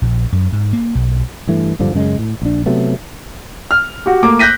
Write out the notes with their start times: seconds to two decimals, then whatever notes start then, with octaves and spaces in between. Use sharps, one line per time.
0.02 A#1
0.32 F#2
0.52 G#2
0.73 A#3
0.95 B1
1.47 G2 E3 A3
1.79 D1 G2 D3 F3
1.95 F#2 C#3 G#3
2.19 A2
2.42 A#1 D4
2.66 C3 F#3 A3 B3
3.71 F6
4.06 F#4 G4
4.23 A3 A#3 D6
4.39 F#6 G6 A#6 B6 D#7